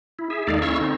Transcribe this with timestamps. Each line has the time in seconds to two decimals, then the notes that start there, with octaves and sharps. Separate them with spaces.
0.19 E4
0.30 G#4 E5
0.47 D#2 G#3 D#4 A4 D5 F5
0.62 C#4 E4 F5 C#6 E6
0.80 D3 C4 D#4